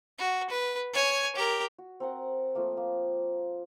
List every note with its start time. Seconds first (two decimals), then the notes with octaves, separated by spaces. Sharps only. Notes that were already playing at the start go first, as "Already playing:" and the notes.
0.18 F#4
0.50 B4
0.93 C#5 G#5
1.36 G4 A#4
1.78 F#4
2.00 C4 A#4 F#5
2.55 F3 A3 A#3
2.77 A#3